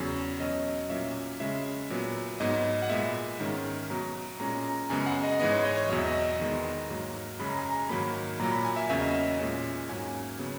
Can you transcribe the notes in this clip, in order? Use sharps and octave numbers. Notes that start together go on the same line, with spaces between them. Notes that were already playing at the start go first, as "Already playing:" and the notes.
Already playing: E2 C#3 F#3 C#4
B2 F#3 C#4 D#5
A#2 F#3 A#3 C#4 E5
C#3 G#3 C#4 E5
A#2 F#3 B3
G#2 F#3 B3 D#5
F#5
A#2 G#3 B3 E5
G#2 D#3 G#3 C#4
B2 F#3 B3 A#5
A#2 G#3 C#4 A#5
A#5
F#2 C#3 G#3 B3 G#5
F#5
D#5
G#2 E3 G#3 B3 D#5
C#5
D#5
C#5
E2 B2 F#3 D#5
E5
D#5
E2 D#3 G#3 B3
G#2 F#3 A#3
F#2 C#3 G#3 C#4 B5
A#5
G#5
A#5
G#2 D#3 F#3 A#3 B5
A#2 F#3 A#3 A#5
B5
G#5
E5
E2 C#3 F#3 A#3 C#4 E5
D#5
E5
A#2 G#3 C#4
G#2 F#3 A#3 C#4 G#5
C#3 F#3 B3